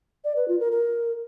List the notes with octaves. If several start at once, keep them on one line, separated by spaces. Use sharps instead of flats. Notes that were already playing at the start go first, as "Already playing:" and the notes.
D5
B4
F4
A#4
A#4